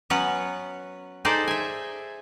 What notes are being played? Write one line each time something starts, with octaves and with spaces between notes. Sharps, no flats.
F#3 B3 C#4 B4 F#5
D#4 G#4 A4 C5 D5
E5 G#5